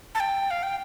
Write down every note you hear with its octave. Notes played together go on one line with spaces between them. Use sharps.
A5
G5
F5
G5